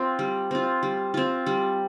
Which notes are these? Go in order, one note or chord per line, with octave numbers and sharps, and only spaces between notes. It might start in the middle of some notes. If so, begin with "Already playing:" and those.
Already playing: C4 F4
G3
C4 F4
G3
C4 F4
G3